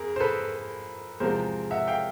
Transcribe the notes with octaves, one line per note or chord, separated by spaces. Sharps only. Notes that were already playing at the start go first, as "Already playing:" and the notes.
Already playing: F2 G#4 A#4
C5
A4 B4
E2 C3 F3 G#3 A#4 C5
E5 F#5
F5 G5